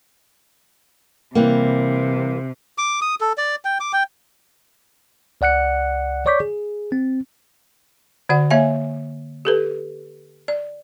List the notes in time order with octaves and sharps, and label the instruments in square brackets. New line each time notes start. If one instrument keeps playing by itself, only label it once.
[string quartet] C3 [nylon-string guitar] E3 G3 A#3
[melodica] D6
D#6
A4
D5
G5
D6
G5
[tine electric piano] C#2 D5 F#5 F#6 C#7
C#5 D5 C#6 D6 G6 B6
G#4
C4
[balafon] D3 F#4 D5 F#5
A#3 C#5 E5 F5 G#5
G4 A4 B4
D5